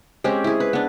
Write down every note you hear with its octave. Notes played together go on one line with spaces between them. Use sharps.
G#3 C4 C#4 G4
E4 G#4
B4
B3 D4